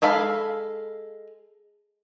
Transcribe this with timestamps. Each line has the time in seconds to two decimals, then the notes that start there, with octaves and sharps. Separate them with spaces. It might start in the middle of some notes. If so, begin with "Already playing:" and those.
0.02 G#3 A4 F5 B5